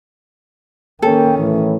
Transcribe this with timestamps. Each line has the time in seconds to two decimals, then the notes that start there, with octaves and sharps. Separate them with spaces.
1.02 D#3 A#3 C#4 A4 G5
1.37 A2 E3